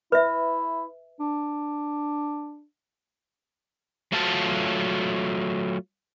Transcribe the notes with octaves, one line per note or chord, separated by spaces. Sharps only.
E4 B4 E5
D4
F#3 A3 F4 F#4 A5